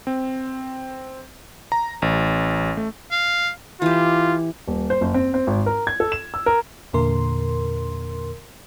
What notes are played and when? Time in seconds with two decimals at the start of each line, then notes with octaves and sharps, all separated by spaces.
0.07 C4
1.72 A#5
2.02 A1
2.77 A3
3.11 F5
3.82 E3 F4 G4
4.67 D#1
4.90 C5
5.01 F#1
5.14 C4
5.34 C4
5.47 G#1
5.66 A#4
5.87 G#6
6.00 A4
6.12 E7
6.34 E6
6.46 A#4
6.93 E2 A#2 D3 A#4 C6